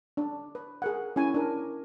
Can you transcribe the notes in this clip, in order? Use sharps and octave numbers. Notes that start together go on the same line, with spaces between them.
D4
B4
G#4 A#4 F#5
C#4 E4 G#5
D4 A#4